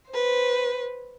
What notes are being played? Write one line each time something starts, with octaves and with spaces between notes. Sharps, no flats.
B4 C5